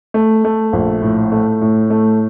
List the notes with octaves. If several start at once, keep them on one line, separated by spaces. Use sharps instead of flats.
A3
A3
A#1
A2
A3
A2
A3